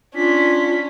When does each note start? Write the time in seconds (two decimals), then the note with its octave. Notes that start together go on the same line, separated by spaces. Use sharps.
0.15 C#4 D4 F4 B6